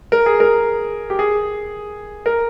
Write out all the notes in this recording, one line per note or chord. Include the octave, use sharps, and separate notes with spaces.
A#4
G#4
A#4
G4
G#4
A#4